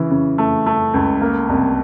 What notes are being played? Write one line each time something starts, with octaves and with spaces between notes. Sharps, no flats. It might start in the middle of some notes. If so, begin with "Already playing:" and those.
Already playing: C#3 E3
C#3
A3
A3
C#2
A#3
C2